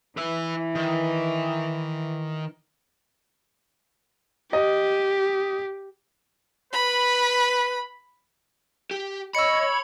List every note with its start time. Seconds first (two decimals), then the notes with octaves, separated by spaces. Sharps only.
0.17 E3 B4 E5
0.75 D#3
4.53 G4 D#5
6.73 B4 B5
8.91 G4
9.35 C#5 D#5 B5 E6 C#7